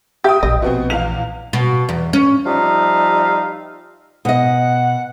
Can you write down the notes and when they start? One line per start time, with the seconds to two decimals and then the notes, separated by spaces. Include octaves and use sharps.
0.24 G4 E5 G5 D#6
0.43 A#1 A2 D#5
0.62 B2 B3 C4
0.90 E2 F5 F7
1.53 B2
1.89 E2
2.13 C#4
2.46 F3 G3 D#4 E5 F5
4.25 B2 D#5 F#5